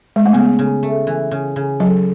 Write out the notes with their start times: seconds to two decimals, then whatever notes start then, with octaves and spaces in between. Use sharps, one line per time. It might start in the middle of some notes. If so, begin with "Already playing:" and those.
0.16 G#3
0.26 A3
0.33 C#3 B3
0.59 C#3
0.83 A3
1.07 E3
1.31 C#3
1.56 C#3
1.80 F#3 A4